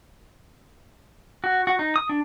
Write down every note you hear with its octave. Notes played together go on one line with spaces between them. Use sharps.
F#4
F#4
D#4
D#6
D4